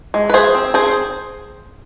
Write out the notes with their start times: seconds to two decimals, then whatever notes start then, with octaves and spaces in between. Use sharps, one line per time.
0.14 G#3
0.30 B4
0.33 F3 G#4 C5
0.55 C4
0.74 C4 G#4 C5